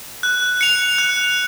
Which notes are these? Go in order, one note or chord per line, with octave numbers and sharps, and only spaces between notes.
F#6
C#7 F7
F#6